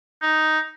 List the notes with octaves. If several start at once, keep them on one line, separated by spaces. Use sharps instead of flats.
D#4